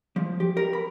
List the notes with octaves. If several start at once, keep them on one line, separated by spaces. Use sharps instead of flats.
F3
G4
A#4
B5